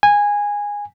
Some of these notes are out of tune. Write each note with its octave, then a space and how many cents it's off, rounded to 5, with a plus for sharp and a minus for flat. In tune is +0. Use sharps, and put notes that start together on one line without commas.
G#5 -15